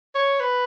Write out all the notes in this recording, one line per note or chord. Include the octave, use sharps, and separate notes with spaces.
C#5
B4